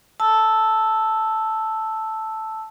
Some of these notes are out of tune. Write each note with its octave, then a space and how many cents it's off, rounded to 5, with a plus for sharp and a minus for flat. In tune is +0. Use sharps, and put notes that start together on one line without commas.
A5 +0 E6 +0